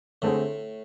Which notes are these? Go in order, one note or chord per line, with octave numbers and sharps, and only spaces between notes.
A2 D3 A3 C4 G#4